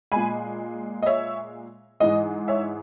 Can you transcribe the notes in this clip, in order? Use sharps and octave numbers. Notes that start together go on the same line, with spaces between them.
A#2 G#3 G#5 B5
D#5
C#5 E5
G#2 E3 G#3 D#5
C#5 E5